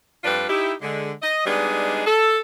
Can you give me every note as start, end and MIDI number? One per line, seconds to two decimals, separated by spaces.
0.24 0.48 41
0.24 0.48 55
0.24 0.48 62
0.24 0.48 65
0.24 0.48 71
0.49 0.72 63
0.49 0.72 64
0.49 0.72 67
0.81 1.11 50
0.81 1.11 56
1.22 1.42 75
1.46 2.01 55
1.46 2.01 56
1.46 2.01 59
1.46 2.01 62
1.46 2.01 63
1.46 2.01 68
2.06 2.39 69